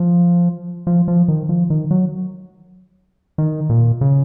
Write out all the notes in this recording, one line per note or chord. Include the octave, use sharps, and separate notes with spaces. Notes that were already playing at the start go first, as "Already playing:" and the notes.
Already playing: F3
F3
F3
D#3
F3
D#3
F#3
D#3
A#2
C#3